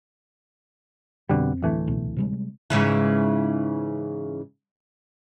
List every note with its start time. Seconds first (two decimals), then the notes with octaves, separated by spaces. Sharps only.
1.29 F2 B2 D3 G3 C4
1.62 D1 E3 A3
1.88 C#2 B2
2.17 C3 G3 G#3
2.70 G#2 C#3 E3